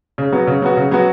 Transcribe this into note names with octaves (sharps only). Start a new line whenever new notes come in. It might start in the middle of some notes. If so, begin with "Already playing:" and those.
C#3
F#3 B3 F#4
C#3
F#3 B3 F#4
C#3
F#3 B3 F#4